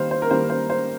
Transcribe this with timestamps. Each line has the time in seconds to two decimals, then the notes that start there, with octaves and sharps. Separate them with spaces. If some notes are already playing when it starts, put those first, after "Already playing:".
Already playing: D#3 G3 A#3 C5 F5
0.11 C5
0.22 A#4
0.31 D#3 G3 A#3 C5
0.50 C5
0.70 C5